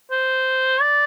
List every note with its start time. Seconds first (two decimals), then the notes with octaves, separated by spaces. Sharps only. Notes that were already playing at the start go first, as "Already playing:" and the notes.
0.11 C5
0.81 D5